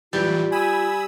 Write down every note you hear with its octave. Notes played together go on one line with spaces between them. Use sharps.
F#2 A2 E3 G3 F4
G#5 B5 D#6 E6